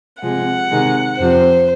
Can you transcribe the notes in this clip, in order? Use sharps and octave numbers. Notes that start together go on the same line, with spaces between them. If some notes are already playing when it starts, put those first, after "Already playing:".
C3 F3 G#3 F#5
C3 D#3 G#3
F2 C3 F3 C5